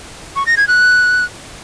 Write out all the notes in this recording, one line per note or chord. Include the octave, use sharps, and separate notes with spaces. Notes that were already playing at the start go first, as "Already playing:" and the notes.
C#6
A#6
G#6
F#6